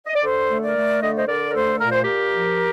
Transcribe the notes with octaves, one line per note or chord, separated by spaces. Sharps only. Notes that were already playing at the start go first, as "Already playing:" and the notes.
D#5
D5
D3 A4 C5
A3
A#4 D5
A3
D3 D#5
C5 D#5
D3 A#4 D5
A#4
A3 A4 C5
A#2 A#4
C5
A#2 G4 A#4
F3